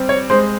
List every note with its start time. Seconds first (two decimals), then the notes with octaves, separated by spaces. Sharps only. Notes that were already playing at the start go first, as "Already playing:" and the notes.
Already playing: G3 C4
0.09 C#5
0.30 G#3 C5